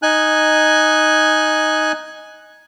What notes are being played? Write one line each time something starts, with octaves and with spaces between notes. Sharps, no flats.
D#4 G#5 F#6